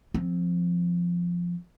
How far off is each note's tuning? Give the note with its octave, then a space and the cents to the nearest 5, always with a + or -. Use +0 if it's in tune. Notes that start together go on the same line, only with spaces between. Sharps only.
F3 +0 C4 +0